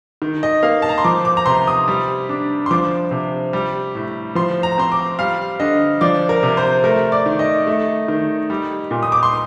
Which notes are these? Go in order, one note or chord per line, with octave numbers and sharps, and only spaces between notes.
D#3
D#5
A#3 F5
A5
A#5
C6
F3 D6
D6
A#5
C3 C6
D#6
G3
D4
C6
F3 D6
C3
G3
A2
F3 C6
A#5
C4 C6
D6
G3 F5
D3 D#5
F3 D5
A#4
C3
C5
A3 A#4
D5
D#3
D#5
A3
D#3
G3
A#2
D#6
D6
C6